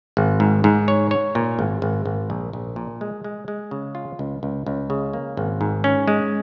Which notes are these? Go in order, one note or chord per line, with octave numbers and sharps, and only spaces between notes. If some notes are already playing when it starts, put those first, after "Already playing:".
G#1
G#2
G#2
C#5
C#5
A#2
G#1
G#1
G#1
A#1
A#1
A#2
G#3
G#3
G#3
C#3
F4
C#2
C#2
C#2
C#3
A#3
G#1
G#2
C#4
G#3